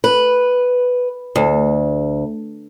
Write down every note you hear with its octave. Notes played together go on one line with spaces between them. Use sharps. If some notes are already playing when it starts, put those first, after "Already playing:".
B4
D2